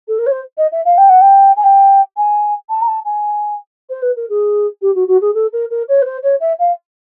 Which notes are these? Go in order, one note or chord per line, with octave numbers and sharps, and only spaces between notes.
A4
A#4
C#5
C5
D#5
E5
F5
G5
F#5
G5
G#5
G5
G#5
A5
A#5
A5
G#5
C5
B4
A#4
G#4
G4
F#4
F#4
G#4
A4
A#4
A#4
C#5
B4
C5
C#5
E5
F5